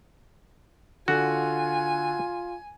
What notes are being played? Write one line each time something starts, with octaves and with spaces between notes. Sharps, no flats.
D3 F4 F#4 G#5